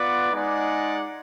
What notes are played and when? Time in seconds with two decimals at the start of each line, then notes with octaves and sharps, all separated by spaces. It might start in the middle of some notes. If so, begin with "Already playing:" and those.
Already playing: B3 F4 B4 D5 F#5
0.32 G#3 D#4 G#4 D5 F#5